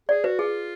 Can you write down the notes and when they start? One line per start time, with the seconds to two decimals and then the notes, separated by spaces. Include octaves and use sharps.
0.09 G#4 D5
0.24 F#4 B4
0.39 F4 G#4